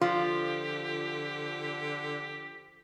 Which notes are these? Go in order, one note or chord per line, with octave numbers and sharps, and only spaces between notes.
D3 F3 F4 G4